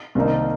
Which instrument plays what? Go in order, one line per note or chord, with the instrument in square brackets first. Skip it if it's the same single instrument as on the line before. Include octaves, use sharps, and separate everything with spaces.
[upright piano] C2 C3 D#3 A#3 D#4